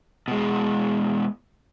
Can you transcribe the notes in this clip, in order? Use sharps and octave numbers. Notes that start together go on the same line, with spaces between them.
B2 G#3